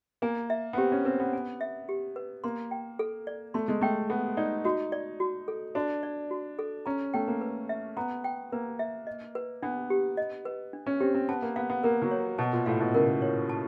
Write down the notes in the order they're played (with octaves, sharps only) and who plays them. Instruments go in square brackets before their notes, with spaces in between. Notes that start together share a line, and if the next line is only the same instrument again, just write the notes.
[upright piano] A#3 [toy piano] G#5
[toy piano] E5
[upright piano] B3
[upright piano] C4 [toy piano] G4
[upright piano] C#4
[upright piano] C4 [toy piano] B4
[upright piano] B3
[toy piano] G#5
E5
G4
B4
[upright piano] A#3 [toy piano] C6
[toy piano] G5
A4
D5
[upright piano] A3 [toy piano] C6
[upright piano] G#3
[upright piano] A3 [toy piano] G5
[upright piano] B3 [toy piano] A4
[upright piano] D#4 [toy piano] D5
[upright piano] D#4 [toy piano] F#4
[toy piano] D5
F#4
A4
[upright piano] D4 [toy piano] F#4
[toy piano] D5
F#4
A4
[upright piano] C#4 [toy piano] A#5
[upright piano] A3 [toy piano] G5
[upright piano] A#3
[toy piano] B4
E5
[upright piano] B3 [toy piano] A#5
[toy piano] G5
[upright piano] A#3 [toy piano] B4
[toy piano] E5
D#5
B4
[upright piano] B3 [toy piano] D4
[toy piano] G4
D#5
B4
D4
[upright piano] C#4
[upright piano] C4 [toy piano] G4
[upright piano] C4
[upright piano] B3 [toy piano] A5
[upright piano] A#3
[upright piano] B3 [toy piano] F5
[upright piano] B3
[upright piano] A#3 [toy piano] A#4
[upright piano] F#3
[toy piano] C#5
[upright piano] B2 [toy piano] A5
[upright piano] A#2
[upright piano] A2 [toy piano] F5
[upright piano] B2
[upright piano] C#3 [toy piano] A#4
[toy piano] C#5
A5